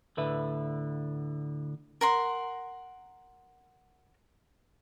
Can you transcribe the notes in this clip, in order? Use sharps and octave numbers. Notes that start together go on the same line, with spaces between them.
D2 A2 D3 B4 E5
A#4 F#5 C6